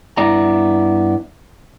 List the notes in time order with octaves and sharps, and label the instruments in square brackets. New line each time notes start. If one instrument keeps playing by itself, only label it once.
[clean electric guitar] G2 B3 E4 D5 A#5